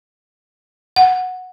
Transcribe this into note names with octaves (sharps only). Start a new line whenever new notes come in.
F#5